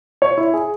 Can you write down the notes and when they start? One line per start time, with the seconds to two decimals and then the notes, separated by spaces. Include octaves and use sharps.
0.22 C#5
0.38 E4
0.54 G#4